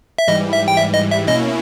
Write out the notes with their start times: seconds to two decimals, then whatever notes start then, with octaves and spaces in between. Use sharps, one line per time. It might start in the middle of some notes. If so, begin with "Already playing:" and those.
0.18 E5
0.27 G#2 E3 G3 D#5
0.53 E5
0.68 G5
0.77 E5
0.94 D#5
1.11 E5
1.27 B2 A#3 C#4 E4 D#5